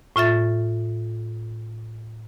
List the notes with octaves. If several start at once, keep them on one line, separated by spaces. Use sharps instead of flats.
A2 F4 E5 A6